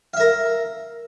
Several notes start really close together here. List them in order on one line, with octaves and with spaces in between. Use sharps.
F5 E5 A#4